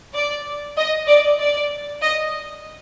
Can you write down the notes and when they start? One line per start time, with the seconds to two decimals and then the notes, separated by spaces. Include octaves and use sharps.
0.14 D5
0.77 D#5
1.08 D5
1.40 D5
2.02 D#5